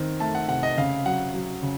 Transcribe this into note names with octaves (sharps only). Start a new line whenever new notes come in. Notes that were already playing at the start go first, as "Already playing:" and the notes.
Already playing: D#3 C4
A3 A5
F#5
C3 F#5
D#5
C#3 F5
F#3 F#5
F#3
C#3